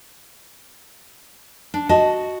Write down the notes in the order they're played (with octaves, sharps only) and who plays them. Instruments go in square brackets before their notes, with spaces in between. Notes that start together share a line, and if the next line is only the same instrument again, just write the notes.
[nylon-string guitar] D4
F#4 D#5 A5